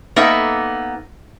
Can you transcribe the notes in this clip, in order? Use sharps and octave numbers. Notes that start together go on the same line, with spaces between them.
A#3 B3 D#4 A4 E5